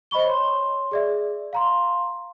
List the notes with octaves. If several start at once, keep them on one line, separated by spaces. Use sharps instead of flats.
C5 D#5 B5 C#6 G7
C#5 C6
G#4 D5 E5
F5 A#5 C6